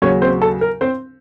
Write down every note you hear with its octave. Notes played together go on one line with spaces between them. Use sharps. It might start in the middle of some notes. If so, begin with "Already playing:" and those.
D#2 C#3 F#3 C#4 C#5
C4 C5
A4
A#4
C4 C5